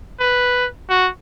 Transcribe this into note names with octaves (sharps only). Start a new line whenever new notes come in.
B4
F#4